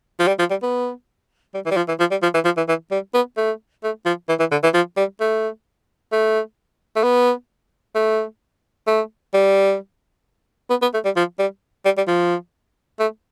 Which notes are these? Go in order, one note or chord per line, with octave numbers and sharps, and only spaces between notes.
F3
G3
F3
G3
B3
G3
E3
G3
F3
E3
F3
G3
F3
E3
F3
E3
E3
G3
B3
A3
A3
F3
E3
E3
D3
E3
F3
G3
A3
A3
A3
B3
A3
A3
G3
B3
B3
A3
G3
F3
G3
G3
G3
F3
A3